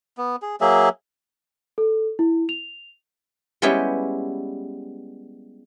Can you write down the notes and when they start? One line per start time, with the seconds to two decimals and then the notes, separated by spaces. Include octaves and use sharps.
0.18 B3
0.42 G#4
0.61 F#3 A#3 G#4 E5
1.78 A4
2.19 E4
2.49 F7
3.62 G3 G#3 B3 C#4 E4 G4